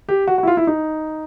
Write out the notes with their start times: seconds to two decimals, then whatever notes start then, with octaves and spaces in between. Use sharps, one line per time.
0.09 G4
0.28 F#4
0.38 F#4
0.43 E4
0.47 F4
0.57 E4
0.67 D#4